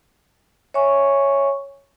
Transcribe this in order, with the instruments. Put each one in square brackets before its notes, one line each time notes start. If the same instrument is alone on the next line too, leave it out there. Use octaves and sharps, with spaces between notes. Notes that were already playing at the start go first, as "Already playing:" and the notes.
[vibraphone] C#5 E5 G#5 C#6